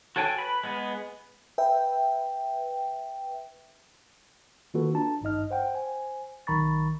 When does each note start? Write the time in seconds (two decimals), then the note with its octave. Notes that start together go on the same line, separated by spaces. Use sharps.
0.16 F#4 A4 C#5 G5 G#5
0.38 B4 B5
0.63 G#3 B3 B4
1.58 B4 E5 G5
4.74 D#3 A#3 F4 F#4 A4 B4
4.94 D4 A5 A#5
5.21 G#1 G2 D#4 D#5 F6
5.51 C5 F#5 G5
5.74 C5 G#5
6.47 B1 D#3 A#5 B5 C#6 A6